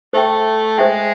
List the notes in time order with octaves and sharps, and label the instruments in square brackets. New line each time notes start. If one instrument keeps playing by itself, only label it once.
[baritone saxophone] A3 [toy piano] C5 E5 G5
[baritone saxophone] G#3 [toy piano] C5 E5 G5